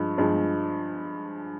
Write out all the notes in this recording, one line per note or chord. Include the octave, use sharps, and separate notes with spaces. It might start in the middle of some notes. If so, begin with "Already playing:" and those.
Already playing: G2 F3 G#3
G2 F3 G#3